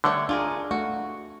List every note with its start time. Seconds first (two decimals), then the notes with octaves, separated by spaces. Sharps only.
0.04 D3 G3 A3 C#5
0.29 D4 F4 G#4 A#4
0.71 A3 F#4